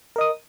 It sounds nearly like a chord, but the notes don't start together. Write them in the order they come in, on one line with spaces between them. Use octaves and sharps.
A#4 D#5 D#6